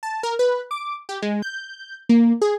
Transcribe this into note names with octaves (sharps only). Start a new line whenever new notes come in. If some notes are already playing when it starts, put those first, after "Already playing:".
A5
A#4
B4
D6
G4
G#3
G6
A#3
G#4